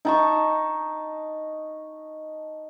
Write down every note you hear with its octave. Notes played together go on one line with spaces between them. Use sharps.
D#4 A5 C#6